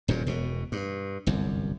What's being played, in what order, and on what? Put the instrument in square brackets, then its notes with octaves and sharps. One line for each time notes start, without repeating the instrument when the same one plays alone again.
[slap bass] D#1 F#2 A#2
E1 B2
G2
G1 C2 F#2